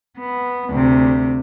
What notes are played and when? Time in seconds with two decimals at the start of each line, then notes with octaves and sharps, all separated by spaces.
0.18 B3
0.71 D2 C3